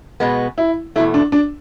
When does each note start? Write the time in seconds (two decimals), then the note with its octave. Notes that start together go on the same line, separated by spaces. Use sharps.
0.20 B2 G#3 B3
0.58 E4
0.96 E2 B2 A3 E4
1.14 D4
1.32 D4